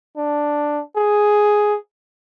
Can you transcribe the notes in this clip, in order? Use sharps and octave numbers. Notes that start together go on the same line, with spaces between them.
D4
G#4